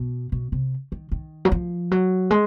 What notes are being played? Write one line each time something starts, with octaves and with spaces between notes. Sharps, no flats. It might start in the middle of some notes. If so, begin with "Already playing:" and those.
Already playing: B2
B2
C3
D#3
D#3
F#3
F3
F#3
G#3